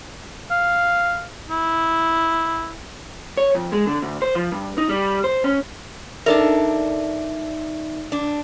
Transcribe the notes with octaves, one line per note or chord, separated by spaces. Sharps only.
F5
E4
C#5
F2
G#3
D3
D2
C5
F3
G2
D#4
G3
C5
C#4
D4 D#4 A4 A#4 D5 E5
D4